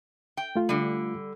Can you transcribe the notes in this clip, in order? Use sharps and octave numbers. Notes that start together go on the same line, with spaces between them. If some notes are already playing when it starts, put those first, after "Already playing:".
G5
A3 F4
D3 G3